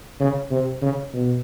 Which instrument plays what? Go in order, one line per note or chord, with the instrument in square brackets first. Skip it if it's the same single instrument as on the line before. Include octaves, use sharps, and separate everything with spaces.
[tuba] C#3
C3
C#3
B2